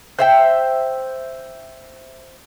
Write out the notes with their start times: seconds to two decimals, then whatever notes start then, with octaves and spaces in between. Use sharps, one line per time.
0.19 C5 E5 G5